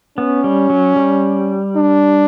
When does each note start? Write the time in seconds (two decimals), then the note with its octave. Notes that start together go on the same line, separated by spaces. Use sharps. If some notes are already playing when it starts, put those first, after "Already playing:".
0.17 B3 C#4
0.44 G3
0.70 F#3
0.96 G3
1.76 D4